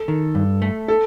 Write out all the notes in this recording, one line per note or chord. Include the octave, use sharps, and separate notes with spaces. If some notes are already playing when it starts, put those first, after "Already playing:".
Already playing: A4
D#3
G2
A3
A4